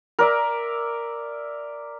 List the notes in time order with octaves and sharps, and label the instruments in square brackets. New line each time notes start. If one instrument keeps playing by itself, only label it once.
[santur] A#4 D5 E5